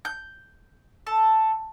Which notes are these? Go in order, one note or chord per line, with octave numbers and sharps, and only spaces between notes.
G6
A4